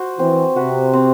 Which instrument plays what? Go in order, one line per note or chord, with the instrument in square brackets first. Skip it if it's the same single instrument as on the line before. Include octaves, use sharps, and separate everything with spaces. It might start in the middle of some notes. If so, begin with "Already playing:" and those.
Already playing: [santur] F#4 C5
[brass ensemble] E3 [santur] C4
[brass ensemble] C3 [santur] F#4 B4
[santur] C4